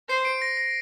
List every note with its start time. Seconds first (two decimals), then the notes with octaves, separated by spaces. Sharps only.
0.09 C5 C7
0.25 D7
0.42 A#6
0.57 A#6